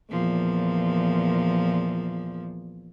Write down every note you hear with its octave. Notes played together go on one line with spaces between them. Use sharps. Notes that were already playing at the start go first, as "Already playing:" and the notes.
E2 A#2 F3